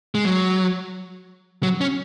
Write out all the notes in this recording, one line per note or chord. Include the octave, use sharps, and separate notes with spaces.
G#3
F#3
F#3
C#4